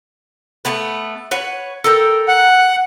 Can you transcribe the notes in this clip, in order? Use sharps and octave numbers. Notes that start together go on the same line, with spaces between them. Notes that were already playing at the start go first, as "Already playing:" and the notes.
A3 B3 B4
B4 C#5 F#5
A4 A#4 G5
F#5